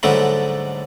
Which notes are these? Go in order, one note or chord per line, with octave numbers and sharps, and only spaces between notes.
G#2 D3 F#3 G3 A3